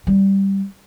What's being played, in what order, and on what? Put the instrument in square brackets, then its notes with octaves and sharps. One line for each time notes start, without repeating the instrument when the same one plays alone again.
[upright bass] G3